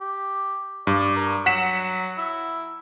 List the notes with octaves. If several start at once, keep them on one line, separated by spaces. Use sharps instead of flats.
G4
G2 D5
A#4
F#3 F#5 B6 E7
E4